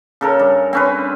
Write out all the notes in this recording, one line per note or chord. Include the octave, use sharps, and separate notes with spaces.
C#3 A4 A#4
G2
C4 C#4 B4